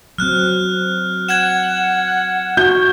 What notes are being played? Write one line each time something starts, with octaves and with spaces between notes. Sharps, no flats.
F#3 C4 F6 F#6
F#5 G#6 E7
F#4 G6